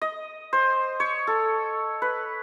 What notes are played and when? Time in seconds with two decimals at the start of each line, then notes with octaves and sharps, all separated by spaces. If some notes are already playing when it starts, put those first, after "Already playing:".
0.02 D#5
0.53 C5
1.00 C#5
1.27 A4
2.02 B4